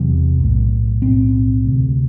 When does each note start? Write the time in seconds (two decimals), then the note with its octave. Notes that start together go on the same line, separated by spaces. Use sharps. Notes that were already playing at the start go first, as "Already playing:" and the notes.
Already playing: E1 E2 C3 F#3
0.39 B1 A2
1.02 B1 A2 C4
1.64 D2 C3